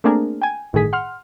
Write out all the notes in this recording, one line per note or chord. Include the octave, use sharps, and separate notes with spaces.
A3 A#3 C4 D4 G#4 A#4
G5 G#5
G1 A2 D#3 G#4 B6
F#5 C6 F6